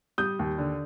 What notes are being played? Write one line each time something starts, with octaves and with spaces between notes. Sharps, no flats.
G3 D#6 G6
D#2
D3